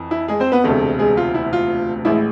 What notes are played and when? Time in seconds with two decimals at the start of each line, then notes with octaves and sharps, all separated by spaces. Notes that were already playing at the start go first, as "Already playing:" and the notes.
Already playing: F2 E3
0.11 E4
0.28 G#3 G#4
0.40 C4 C5
0.52 B3 B4
0.64 E1 D2 C3 G#3 A3 A4
0.99 G#3 G#4
1.17 F4
1.34 E4
1.53 F4
2.05 A1 A2 G#3 E4